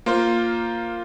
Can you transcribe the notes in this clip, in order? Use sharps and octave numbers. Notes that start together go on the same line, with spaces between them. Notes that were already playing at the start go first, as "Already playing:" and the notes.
A#3 F4 C5